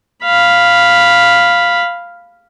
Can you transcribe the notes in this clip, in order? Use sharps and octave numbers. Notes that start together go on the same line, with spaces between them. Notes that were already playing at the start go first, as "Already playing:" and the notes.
F5 B5